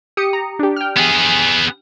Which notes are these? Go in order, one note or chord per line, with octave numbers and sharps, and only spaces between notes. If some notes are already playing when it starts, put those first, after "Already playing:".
G4 D#6 C#7
A#5
D4 G4
G5 F6
B3 G#4